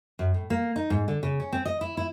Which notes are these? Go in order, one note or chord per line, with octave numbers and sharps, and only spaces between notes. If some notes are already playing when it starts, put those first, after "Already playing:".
F#2
A2
A#3
D#4
G#2
D3
C#3
C#4
C4
D#5
E4
E4